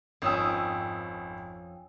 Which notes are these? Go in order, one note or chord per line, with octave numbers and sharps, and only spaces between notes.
G#1 F2 C#4 G5 D#6 E6